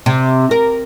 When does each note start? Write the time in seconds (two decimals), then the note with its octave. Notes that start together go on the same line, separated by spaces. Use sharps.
0.06 C3
0.51 A#4